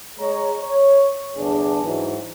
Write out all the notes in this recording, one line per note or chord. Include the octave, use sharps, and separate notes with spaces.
G#3 C#5 A#5
C#5
G1 E2 D4 G#4
G#2 E3 F#3